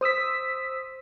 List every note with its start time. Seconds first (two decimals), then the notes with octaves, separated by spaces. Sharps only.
0.01 C5 D#6 E6 B6